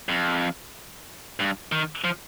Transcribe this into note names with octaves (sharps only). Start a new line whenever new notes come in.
F2
G2
D#3
F3